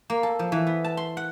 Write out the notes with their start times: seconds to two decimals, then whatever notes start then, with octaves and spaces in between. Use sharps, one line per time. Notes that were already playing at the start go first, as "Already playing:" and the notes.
0.10 A#3
0.23 A4
0.39 F3
0.52 E3
0.67 B3
0.84 A5
0.97 C6
1.17 F#5